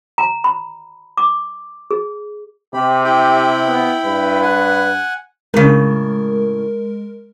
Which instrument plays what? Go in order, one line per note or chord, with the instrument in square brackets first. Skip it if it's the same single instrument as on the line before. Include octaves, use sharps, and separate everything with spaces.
[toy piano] A#5
B5
D6
G#4
[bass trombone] C3 [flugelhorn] G4 [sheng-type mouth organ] B5
[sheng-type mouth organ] E4 G5 B5 [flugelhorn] G4
[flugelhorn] B3
[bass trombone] G2 [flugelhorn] B4
[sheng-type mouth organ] F#5 G#5
[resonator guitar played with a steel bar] A2 C#3 [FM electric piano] G#3 A#4